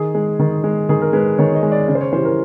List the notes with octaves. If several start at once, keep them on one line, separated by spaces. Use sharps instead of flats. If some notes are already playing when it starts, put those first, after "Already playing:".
Already playing: D#3 G#4
G#3
D#3
G#3
D#3 G#4
A#4
G#3 B4
D#3 C#5
D#5
G#3
D5
C#3 D5
C5
C#5
E3 G3 C5
A#4